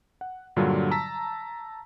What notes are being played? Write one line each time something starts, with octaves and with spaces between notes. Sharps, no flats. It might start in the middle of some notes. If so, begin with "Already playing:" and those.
F#5
G2 A#2 D3 F#3 G3 F4
A5 A#5 E6 B6